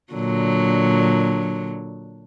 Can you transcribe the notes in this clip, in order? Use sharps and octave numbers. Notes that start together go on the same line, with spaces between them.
A#2 D3 F#3